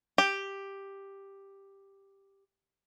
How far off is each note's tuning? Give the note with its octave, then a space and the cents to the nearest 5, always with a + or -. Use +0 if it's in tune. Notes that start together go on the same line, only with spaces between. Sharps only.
G4 +5